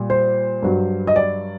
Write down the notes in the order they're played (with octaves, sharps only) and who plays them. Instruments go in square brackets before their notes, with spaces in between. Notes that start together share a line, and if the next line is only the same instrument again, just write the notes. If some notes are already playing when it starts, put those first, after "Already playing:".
Already playing: [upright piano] A#2 G3
C5
G2 F#3
D#5
D5